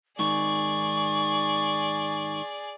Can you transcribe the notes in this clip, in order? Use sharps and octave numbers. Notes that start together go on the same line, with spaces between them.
G#2 D#3 G#4 D5 C#6